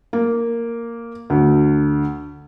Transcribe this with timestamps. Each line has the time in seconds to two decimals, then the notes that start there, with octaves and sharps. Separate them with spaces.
0.13 A#3
1.30 D2